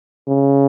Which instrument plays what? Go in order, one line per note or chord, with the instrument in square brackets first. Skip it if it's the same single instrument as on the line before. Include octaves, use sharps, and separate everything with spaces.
[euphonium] C#3